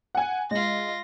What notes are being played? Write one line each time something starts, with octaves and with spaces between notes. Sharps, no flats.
F#5 G#5
G#3 F4 A#6